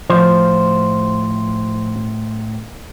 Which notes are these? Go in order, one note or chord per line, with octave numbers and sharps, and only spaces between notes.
A2 F3 C5